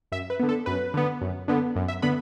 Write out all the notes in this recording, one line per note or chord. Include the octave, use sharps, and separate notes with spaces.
F#2 E5
B4
D3 B3
A4
F#2 B4
D3 B3
F#2
D3 B3
F#2
E5
D3 B3 B5